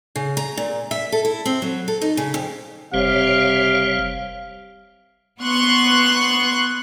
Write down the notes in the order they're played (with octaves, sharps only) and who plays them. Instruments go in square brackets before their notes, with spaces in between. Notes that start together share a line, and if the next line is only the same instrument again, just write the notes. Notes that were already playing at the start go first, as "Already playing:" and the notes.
[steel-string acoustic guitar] C#3
A#5
A#2
E5
A4
E4
C4
F#3
A4
D#4
C#3
F2
[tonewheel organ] F#1 G3 C#5 [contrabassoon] C3 [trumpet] F5
[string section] B3 C6 C#6 F#6